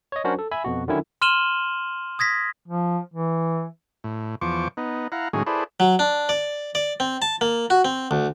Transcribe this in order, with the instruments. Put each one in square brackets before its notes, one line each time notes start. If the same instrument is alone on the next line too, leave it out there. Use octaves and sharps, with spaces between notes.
[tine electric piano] C#5 D#5
F#3 C#4 D4 F#4 A#4 C5
A4
E5 G#5 B5
F2 B2 F#4
D3 D#3 F#3 C#4 E4
[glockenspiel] C6 F6 D#7 E7 F#7 G7
D#6 G#6 A#6 B6
[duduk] F3
E3
[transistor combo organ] A2
E2 F3 C5 C#6 D6
B3 D#4
E4 F5 F#5 A#5
A2 D#3 F#3 G#3 C#4 G#4
E4 G#4 A4 B4 C5 D5
[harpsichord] F#3
D4
D5
D5
C4
A5
A#3
F#4
C4
D2